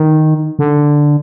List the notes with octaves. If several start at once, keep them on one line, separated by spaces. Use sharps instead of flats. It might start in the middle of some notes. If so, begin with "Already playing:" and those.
Already playing: D#3
D3